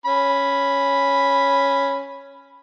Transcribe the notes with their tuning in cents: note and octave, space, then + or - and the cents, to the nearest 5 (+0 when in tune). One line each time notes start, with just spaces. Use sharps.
C#4 +0 B5 +0